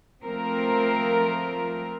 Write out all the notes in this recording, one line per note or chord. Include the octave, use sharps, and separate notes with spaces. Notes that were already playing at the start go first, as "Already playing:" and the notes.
F3 A3 C4 A#4